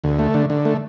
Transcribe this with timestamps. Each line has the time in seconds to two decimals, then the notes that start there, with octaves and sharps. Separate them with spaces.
0.04 D2
0.19 A3
0.34 D3
0.50 D3
0.65 A3